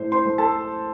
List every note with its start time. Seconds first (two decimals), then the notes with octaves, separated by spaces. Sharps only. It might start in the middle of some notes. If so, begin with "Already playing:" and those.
Already playing: A2 A3 C5
0.12 C5 C6
0.26 A3
0.38 A4 A5